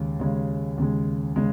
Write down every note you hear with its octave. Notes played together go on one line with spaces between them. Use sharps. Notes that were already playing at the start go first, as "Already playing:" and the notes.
Already playing: D#2 C#3 G#3
D#2 C#3 G#3
D#2 C#3 G#3
C#3 G#3